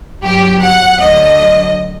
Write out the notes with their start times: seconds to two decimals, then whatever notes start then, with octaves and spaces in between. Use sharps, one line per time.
0.22 G1 G2 F#3 G4
0.61 F#5
1.00 D2 D3 F#3 D#5